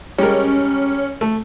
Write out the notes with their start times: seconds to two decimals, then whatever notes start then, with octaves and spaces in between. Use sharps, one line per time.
0.18 G3 G#3 C#4 A#4
1.21 A3